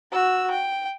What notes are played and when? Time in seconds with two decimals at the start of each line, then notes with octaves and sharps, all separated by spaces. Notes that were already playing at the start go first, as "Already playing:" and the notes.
0.12 F#4 E6
0.51 G5